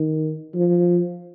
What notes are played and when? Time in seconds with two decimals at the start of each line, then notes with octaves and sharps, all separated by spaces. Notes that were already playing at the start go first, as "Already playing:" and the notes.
Already playing: D#3
0.55 F3